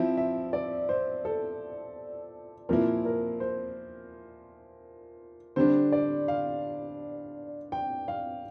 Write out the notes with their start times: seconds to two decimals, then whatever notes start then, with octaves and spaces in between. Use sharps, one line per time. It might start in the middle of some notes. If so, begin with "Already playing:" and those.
Already playing: F3 C4 E4 E5
0.17 E5
0.53 D5
0.89 C5
1.25 A4
2.69 A#2 F3 A#3 E4 A#4
3.05 A#4
3.40 C5
5.56 D3 G3 D4 C5
5.92 D5
6.28 F5
7.72 G5
8.08 F5